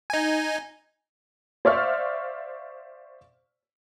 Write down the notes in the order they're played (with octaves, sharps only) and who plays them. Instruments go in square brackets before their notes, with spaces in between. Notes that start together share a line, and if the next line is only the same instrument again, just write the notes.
[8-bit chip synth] D#4 G#5
[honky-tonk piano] C5 D5 E5 F5 C#6 F6